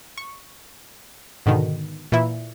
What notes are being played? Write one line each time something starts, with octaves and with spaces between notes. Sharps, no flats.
C#6
G#2 B2 D3 D#3
A#2 E3 E4